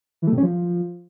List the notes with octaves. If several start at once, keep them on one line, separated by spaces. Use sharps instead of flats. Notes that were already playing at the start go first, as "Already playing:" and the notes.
E3
A3
C3
C#4
F3